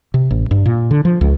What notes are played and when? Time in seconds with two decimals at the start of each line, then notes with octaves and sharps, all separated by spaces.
0.14 C3
0.31 A1
0.51 G2
0.66 A#2
0.91 D3
1.05 F3
1.21 C#2